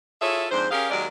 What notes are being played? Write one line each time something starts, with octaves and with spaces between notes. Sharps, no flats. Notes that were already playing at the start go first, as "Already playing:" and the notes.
E4 F4 G#4 A4 C#5 E5
F2 G#2 D4 C5
C#4 G4 G#4 A#4 F5
D#2 F#3 G#3 A#4 D5